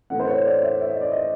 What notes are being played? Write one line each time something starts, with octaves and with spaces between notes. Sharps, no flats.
A2 E3 A3 C4 F#5
C5
C#5
D5
E5
E5
D#5
D5
D#5